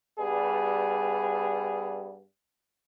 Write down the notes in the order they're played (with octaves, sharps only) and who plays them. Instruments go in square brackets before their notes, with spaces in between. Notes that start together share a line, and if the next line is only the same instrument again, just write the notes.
[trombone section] G2 G3 B3 G#4